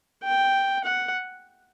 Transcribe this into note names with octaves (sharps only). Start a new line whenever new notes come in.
G5
F#5